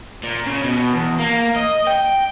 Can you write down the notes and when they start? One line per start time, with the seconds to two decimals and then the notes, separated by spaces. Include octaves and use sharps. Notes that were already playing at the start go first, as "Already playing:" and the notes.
0.23 A#2
0.46 C#3
0.63 B2
0.94 E2
1.20 A#3
1.57 D#5
1.87 G5